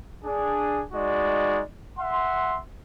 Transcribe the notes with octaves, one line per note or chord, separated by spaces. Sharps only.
D4 G#4
G#3 D#4 F#4 D5
E5 F#5 C6